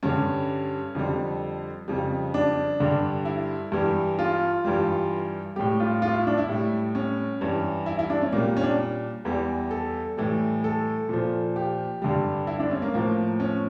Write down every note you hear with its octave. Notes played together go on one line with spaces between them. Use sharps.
G2 D3 G3 C#4
F2 D3 G3
F2 C#3 G3
D4
G2 D3 G3
E4
G2 E3 G3
F4
G2 E3 G3
A2 G3 G4
F4
F4
E4
D4
E4
A2 G3
C#4
G2 E3 G3
E4
E4
D4
C#4
A#2 G3 A#3
C#4
D4
E2 E3 G3
A4
A2 E3 G3
A4
A#2 F3
G4
G2 D3 G3
E4
D4
C#4
A#3
A2 F3 A#3
C#4